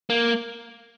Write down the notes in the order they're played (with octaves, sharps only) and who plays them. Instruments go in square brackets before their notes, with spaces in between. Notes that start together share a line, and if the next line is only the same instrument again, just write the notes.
[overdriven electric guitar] A#3